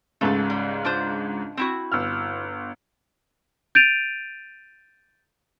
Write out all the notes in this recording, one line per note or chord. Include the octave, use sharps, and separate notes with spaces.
C#2 G#2 C#3 A3 A4
G3
D4 F4 C5
C4 E4 F#4
G1 E6 F6
G6 A6 D7 D#7 F7